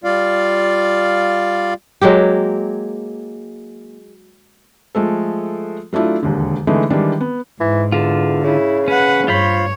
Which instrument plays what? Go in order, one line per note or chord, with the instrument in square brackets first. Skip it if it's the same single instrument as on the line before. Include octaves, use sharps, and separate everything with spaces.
[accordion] G3 F4 D5 F5
[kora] F#3 G#3 A#3 G4
[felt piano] F3 G#3 A3 A4
F#3 A3 D4 E4 F4
E1 D#2 D3
D3 E3 G#3 A3 D#4
D#3 E3 G3 G#3 D4
B3
[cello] G#2 [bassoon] E3
[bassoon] E2 [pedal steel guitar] D3 F4
[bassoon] C#3 [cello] E4
[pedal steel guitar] C#4 [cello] B4 F#5
[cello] G2 C#5 [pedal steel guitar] F4 C5 B5